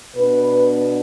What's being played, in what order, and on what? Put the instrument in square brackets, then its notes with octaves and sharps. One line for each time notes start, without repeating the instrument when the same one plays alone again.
[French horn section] B2 B3 D4 B4